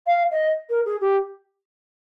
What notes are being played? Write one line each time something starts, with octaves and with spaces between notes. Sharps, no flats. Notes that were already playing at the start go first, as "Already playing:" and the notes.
F5
D#5
A#4
G#4
G4